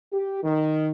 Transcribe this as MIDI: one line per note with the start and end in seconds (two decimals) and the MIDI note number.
0.13 0.42 67
0.44 0.91 51